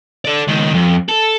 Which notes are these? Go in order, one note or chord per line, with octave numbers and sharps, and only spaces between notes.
A4 D5
C#2 D#3
F2
A4